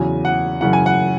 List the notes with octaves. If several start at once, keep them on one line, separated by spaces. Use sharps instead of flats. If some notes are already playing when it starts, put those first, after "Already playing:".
Already playing: E2 C#3 F#3 G#5
F#5
F#2 C#3 E3 F#5
G#5
F#5